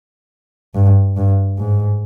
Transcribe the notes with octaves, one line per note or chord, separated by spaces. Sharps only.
G2
G2
G#2